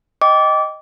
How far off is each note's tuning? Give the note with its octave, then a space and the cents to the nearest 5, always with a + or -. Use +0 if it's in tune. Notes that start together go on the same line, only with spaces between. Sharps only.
D#5 +0 G5 +0 D6 -25